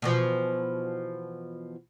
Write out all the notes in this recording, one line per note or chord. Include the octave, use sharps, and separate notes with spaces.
B2 E3 F3